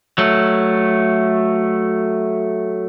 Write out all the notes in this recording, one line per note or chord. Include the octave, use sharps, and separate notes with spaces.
F#3 A3